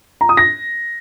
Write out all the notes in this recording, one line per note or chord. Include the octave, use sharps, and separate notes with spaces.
A#5
D#6
A#6